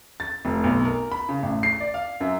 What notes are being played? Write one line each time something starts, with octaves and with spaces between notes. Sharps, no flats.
A6
F1
B1
A#4
B5
C#3
A1
C7
D5
F5
F#2